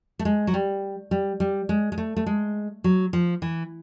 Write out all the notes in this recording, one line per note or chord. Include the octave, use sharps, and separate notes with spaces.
A3
G#3
F#3
G3
G3
G3
G#3
G#3
A3
A3
G#3
F#3
F3
E3